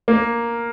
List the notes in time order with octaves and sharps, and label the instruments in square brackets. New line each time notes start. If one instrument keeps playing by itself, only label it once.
[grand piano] A#3